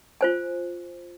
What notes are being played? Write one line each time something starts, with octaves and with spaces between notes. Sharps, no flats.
F4 C5 G#5